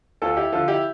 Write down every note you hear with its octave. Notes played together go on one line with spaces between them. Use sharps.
D2 F4 A4
E4 G4
D3 F3 F4 A4
E4 G4